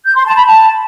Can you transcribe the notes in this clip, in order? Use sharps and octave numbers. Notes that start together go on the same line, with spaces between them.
G6
C6
A5
B5
A5